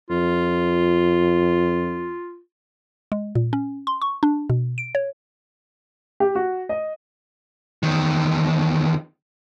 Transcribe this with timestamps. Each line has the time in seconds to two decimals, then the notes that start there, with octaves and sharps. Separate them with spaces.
0.10 F2 F4
3.12 G#3
3.35 A#2
3.53 C#4
3.87 C6
4.02 C#6
4.23 D4
4.50 B2
4.78 D7
4.95 C#5
6.20 G4
6.35 F#4
6.69 D#5
7.83 E2 D#3